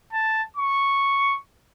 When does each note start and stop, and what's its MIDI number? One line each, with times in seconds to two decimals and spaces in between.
0.13 0.43 81
0.57 1.38 85